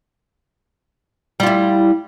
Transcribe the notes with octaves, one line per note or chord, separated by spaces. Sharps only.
G3 E4 F4